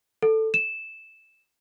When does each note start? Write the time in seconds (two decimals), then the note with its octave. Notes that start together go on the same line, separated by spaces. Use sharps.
0.22 A4
0.54 E7